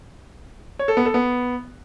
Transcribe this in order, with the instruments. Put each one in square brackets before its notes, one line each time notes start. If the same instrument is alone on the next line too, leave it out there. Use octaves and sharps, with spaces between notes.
[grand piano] C#5
A4
B3
A4
B3